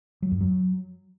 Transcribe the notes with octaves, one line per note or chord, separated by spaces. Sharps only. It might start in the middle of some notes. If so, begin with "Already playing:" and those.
F#3
F#2
F#3